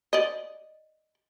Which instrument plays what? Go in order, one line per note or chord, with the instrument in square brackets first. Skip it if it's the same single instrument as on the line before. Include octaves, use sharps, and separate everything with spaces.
[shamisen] D5 D#5